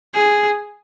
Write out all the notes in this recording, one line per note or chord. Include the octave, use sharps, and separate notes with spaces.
G#4